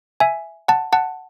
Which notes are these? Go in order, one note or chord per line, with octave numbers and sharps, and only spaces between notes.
E5 G#5
F#5 A5
F#5 A5